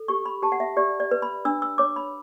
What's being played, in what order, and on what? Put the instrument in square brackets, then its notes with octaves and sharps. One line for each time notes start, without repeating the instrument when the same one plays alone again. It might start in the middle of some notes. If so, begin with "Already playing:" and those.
Already playing: [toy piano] A4
G4 C#6
B5
G4 A5
F#5
E5
G4 D5
D5
B4
B5
D4 E6
E6
C#5 D6
B5